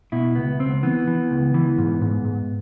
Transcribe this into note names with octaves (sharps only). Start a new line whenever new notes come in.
B2 E4
C#2 B3
C#2 C4
E3 B3
E3
C#2
E3
G#2
G#2
G#2